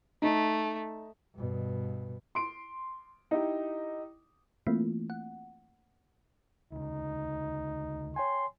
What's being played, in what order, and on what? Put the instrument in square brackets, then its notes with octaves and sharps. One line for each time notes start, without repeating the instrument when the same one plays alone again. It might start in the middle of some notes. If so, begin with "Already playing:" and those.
[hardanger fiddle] A3 [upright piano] D#4
[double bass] G2 B2
[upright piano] C6 D7
D#4 E4 G4
[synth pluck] E3 A3 A#3 C4 E4 F4
F#5
[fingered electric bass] D2 C#3 [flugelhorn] D#4
[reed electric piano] C#5 G5 G#5 [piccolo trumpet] C6